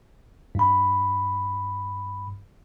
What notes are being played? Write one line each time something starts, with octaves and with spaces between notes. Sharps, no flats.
G2 B5